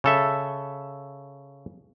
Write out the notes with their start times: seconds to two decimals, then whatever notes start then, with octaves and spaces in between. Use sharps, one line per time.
0.04 C#3 A4 E5